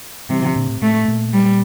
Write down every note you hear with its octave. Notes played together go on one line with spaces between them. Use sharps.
C3 E3 G3
D3 F3
A#2 D3
A2
A2 A3
A#2
G3